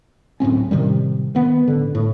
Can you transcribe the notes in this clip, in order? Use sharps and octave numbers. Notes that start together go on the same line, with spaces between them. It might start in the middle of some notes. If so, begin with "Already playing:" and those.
D1 A2 C4 C#4
A2 C3 D#3 G3
D#3 B3
A1 D3
A2